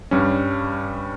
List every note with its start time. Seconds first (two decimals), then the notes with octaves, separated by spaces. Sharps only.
0.11 G2 G3 C#4